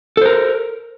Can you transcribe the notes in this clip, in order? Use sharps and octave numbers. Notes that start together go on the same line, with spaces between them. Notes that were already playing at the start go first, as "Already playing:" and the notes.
A4 A#4 C5